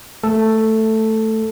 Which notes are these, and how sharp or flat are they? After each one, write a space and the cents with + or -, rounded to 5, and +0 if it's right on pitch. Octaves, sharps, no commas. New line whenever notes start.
A3 +0 A4 +5